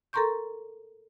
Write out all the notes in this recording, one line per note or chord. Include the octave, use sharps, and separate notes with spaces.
A4 A#4 A#5 C6 C#6 G6